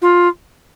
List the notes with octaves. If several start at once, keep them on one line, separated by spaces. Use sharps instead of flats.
F4